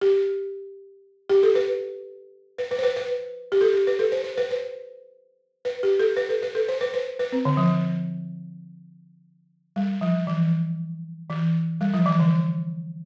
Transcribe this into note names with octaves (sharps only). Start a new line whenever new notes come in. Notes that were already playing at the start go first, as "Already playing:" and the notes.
G4
G4
A4
B4
B4
B4
C5
B4
B4
G4
A4
G4
B4
A4
C5
C5
B4
C5
B4
G4
A4
B4
A4
B4
A4
C5
B4
C5
B4
C4
D3
F3
G3
F3
E3
E3
G3
F3
E3
D3